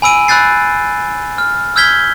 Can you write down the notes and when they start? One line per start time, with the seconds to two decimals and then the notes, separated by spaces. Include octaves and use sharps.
0.02 G#5 B5 E6 D7 D#7
0.28 B5 E6 F#6 G6 A6 C7
1.38 F6
1.76 E6 F6 G6 G#6 B6 G7